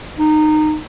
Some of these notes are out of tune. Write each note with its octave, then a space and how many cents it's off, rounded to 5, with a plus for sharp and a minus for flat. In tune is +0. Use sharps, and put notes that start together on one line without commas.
D#4 -20